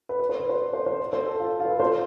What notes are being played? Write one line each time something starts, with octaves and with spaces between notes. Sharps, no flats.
B4
B4
C5
B4
C5
D5
C5
C5
D5
C5
A4
F4
F4
B4
A4
C5